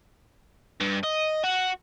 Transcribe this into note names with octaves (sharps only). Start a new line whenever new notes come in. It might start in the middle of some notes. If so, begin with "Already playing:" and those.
G2
D#5
F#4